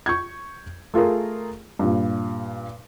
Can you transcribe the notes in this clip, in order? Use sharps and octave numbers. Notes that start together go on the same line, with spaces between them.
C#6 G6 G#6
A3 F4 G#4 A#4
G2 A#2